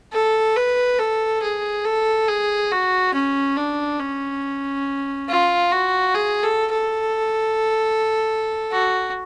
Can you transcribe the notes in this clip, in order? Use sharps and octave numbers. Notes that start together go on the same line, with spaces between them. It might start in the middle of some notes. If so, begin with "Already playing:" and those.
A4
B4
A4
G#4
A4
G#4
F#4
C#4
D4
C#4
F4
F#4
G#4
A4
A4
F#4